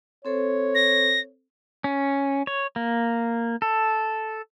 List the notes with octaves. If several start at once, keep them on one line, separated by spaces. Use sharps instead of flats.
C4 A4 C5 C#5
A#6
C#4
C#5
A#3
A4